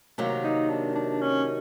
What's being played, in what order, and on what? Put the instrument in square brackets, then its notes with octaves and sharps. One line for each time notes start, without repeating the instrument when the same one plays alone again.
[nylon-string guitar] C3 D#3 F#3 A#3
[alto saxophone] D#4
D4
D4
C#4